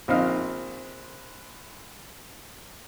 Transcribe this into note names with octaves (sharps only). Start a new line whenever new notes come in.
A#1 C4 D#4 F5